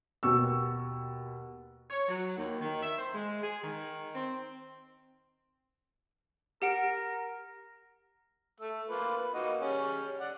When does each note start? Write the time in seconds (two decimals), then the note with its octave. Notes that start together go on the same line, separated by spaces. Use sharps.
0.23 D#2 B2 C#6 E6
1.90 C#5
2.09 F#3
2.38 D#2
2.61 D#3
2.83 E5
2.98 C5
3.15 G#3
3.44 G#4
3.64 D#3
4.15 C4
6.62 G4 A#4 F#5 D7
8.60 A3 E6
8.89 A#3 F4 B4
9.17 B4
9.34 A#3 D#4 F#4
9.61 G3 C#4 G#4
10.20 D5 F#5